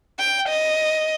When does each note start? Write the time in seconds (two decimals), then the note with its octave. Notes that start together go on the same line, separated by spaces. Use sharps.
0.19 G5
0.49 D#5